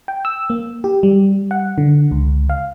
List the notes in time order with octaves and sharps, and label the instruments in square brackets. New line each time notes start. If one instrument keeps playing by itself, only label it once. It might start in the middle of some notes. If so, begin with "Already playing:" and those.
[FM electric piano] G5
E6
A#3
G4
G3
F#5
D3
C#2
F5